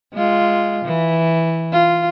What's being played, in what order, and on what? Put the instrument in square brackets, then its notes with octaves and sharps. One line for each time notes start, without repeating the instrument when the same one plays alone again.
[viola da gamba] G#3 F4
E3
F4